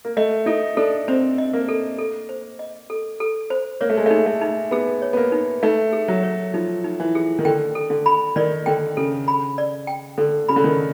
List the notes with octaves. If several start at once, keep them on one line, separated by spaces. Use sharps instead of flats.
A#3
A3 D#5
D#4 A4
D4 A4
C4 C5
D#5
A#3
A4
A4
C5
D#5
A4
A4
C5
A#3 C#5
A3
G#3
A3 D#4
A3
D#4
B3 G#4
C#5
B3
A#3
D#4
A3 D#4
G#4
F#3
C#5
F3 D#4
D#4
E3
G#4
D#3
D3 G5
A4
D3
B5
D#3 D5
D3 G5
C#3 A4
B5
D5
G5
D3 A4
C#3 B5
D3
D#3